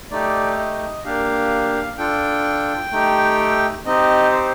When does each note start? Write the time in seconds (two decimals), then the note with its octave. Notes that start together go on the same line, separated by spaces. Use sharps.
0.11 A3 D#4 G4 D5
0.58 D#5
1.05 A#3 D4 G4 F5
1.98 D4 F4 A4 G5
2.92 A3 D#4 G4
3.85 C4 D#4 G4 D#5
4.32 C5